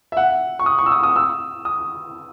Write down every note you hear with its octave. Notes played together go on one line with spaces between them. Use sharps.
E5
F#5
C#6
D#6
C#6
E6
D#6
D#6
E6
D#6